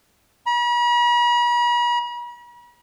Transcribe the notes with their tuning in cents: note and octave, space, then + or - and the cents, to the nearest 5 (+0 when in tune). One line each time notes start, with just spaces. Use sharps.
B5 -45